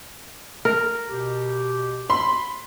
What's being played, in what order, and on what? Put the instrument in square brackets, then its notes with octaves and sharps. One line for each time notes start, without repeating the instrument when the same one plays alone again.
[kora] A#4
[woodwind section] B2 G4
[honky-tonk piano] B5 C6